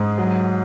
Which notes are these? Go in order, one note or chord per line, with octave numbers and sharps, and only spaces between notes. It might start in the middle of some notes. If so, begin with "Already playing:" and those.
Already playing: G#2 G#4
F#3